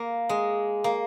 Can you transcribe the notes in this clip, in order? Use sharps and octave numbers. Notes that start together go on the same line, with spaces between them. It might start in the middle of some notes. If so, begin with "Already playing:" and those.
Already playing: A#3
G#3
A#3